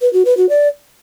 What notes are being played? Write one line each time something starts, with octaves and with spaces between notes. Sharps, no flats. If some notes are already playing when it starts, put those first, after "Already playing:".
B4
F#4
B4
F#4
D5